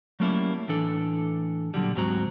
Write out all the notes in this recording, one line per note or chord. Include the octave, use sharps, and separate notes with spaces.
F#3 G3 A3 A#3 C#4 E4
A2 E3 D4 A4
A#2 D3 F#3 G3
D2 G#2 F#3 C4 F#4 A#5